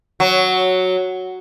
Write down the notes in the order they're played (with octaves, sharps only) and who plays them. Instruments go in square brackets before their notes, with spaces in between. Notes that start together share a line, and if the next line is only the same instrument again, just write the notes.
[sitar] F#3